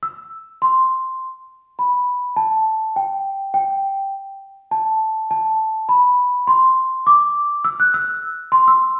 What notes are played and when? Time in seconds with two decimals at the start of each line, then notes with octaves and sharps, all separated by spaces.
0.03 E6
0.62 C6
1.79 B5
2.36 A5
2.96 G5
3.54 G5
4.71 A5
5.31 A5
5.89 B5
6.47 C6
7.07 D6
7.65 E6
7.80 F#6
7.94 E6
8.52 C6
8.68 E6